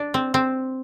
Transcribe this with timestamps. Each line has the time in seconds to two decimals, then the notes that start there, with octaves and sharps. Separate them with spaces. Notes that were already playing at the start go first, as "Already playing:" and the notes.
Already playing: D4
0.14 C4
0.34 C4